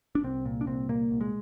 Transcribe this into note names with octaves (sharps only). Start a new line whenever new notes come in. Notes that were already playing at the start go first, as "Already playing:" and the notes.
D4
C2 C4
A#2
D4
C2 C4
A#2 A#3
C2
G#3